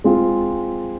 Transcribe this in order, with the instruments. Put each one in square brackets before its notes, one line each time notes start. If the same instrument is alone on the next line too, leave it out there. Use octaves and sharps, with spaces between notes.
[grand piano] G#3 C4 F4